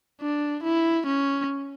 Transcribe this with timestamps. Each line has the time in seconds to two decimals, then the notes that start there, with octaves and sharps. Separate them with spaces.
0.22 D4
0.64 E4
1.06 C#4